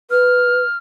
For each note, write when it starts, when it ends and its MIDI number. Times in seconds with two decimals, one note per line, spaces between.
0.11 0.62 71
0.11 0.78 89